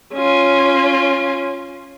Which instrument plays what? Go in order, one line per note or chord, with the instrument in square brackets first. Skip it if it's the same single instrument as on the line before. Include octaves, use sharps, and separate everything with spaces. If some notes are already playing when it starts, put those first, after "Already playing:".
[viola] C#4 F4